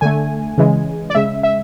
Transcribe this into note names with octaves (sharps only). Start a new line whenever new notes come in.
D3 A3 G#5
C#3 E3 G#3
D5
C#3 G#3 E5
E5